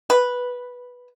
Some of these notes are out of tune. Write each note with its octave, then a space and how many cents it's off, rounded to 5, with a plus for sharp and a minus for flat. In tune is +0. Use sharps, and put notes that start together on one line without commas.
B4 -5